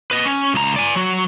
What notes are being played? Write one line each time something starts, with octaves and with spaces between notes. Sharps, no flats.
B4 D#5
C#4
C#2 A#5
D5 G#5
F#3 F#4